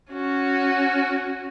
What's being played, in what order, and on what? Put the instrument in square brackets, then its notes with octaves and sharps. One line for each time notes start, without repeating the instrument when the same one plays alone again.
[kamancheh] C#4 F#4